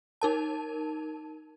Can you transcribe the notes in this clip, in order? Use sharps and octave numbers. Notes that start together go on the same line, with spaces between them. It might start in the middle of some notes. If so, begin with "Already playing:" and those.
D#4 A#4 A5